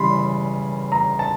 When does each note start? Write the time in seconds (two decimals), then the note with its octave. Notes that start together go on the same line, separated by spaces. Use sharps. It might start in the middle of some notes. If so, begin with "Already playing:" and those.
Already playing: C#3 E3 G3 B5 C6
0.92 A#5
1.19 A5